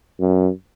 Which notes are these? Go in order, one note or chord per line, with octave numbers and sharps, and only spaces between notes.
F#2